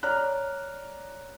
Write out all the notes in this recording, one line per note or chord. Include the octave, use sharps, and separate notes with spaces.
C#5 D5 A#5 F6 F#6